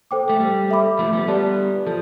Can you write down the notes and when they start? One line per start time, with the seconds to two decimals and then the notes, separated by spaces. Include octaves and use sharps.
0.11 A4 C5 G5 D6
0.29 A3
0.40 G3
0.70 A4 E5 B5 D6
0.99 F3 A3
1.13 G3 B3
1.28 G3 B3 G4 D5 A5
1.86 F3 A4 A5